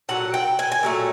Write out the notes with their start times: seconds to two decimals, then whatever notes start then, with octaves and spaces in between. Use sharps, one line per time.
0.09 A#2 F#3 A3 F#5
0.34 G5
0.59 G#5
0.72 G#5
0.83 A#2 F#3 A3